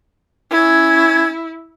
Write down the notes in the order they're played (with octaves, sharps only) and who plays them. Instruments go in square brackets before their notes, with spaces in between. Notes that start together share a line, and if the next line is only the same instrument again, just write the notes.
[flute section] C#4 G#6 [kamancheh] E4